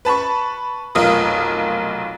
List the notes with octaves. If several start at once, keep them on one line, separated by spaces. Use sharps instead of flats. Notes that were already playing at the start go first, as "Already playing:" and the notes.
B4 A5 B5 C#6
F1 B1 F4 A#4 D#6